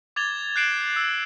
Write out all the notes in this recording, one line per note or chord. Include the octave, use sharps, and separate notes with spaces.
D6 G#6 A6 F7 G7
F#6 G6 C7 D7 E7 F#7
E6